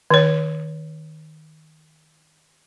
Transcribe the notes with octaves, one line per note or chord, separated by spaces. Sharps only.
D#3 C#5